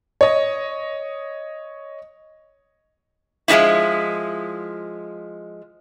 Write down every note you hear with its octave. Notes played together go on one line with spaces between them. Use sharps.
C#5 D#5
F3 G#3 A#3 D#4 E4